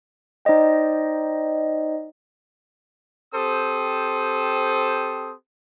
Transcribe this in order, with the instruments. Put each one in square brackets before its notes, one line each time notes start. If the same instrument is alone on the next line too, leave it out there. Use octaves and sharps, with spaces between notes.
[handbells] D#4 C5 D5 D#5 G5
[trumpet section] C4 G4 A4 C5 D#6